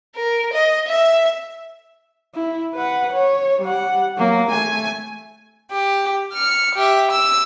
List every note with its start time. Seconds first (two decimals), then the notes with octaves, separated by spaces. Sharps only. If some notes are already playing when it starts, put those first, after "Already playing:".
0.15 A#4
0.53 D#5
0.88 E5
2.35 E4
2.75 B4 F#5
3.13 C#5
3.61 G3 F#5
4.18 F#3 A#3
4.49 A3 G#5
5.72 G4
6.33 F6 C#7
6.75 G4 E5
7.11 E6